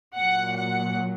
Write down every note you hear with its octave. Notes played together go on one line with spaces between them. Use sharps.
A#2 F#3 F#5
F#5